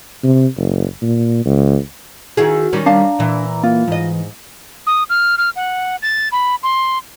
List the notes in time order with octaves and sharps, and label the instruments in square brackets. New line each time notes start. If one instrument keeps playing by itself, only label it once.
[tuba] C3
F#1
A#2
C#2
[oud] D#3 E4 G#4 [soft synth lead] F#4
[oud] D#3 G3 C#4
[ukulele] D4 F5 A5 [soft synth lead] A#5
[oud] A#2 E3
[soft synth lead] A#3 [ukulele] F4
[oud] G#2 D#5 [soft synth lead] E3
[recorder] D#6
F6
F6
F#5
A6
B5
C6